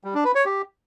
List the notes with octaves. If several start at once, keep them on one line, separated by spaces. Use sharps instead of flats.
G3
D4
B4
C#5
G4